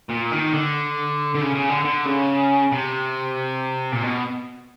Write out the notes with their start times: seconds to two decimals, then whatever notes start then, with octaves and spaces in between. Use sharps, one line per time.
0.09 A#2
0.31 D#3
0.53 D3
1.35 D3
1.41 C#3
1.55 C#3
1.70 D3
1.85 D3
2.06 C#3
2.72 C3
3.92 A#2
4.03 B2